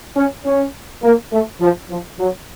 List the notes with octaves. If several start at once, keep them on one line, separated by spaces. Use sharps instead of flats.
C#4
C#4
A#3
A3
F3
F3
F#3